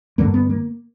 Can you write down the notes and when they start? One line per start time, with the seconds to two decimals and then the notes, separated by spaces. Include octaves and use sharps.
0.18 G2 D3 A#3
0.34 B3
0.50 A#3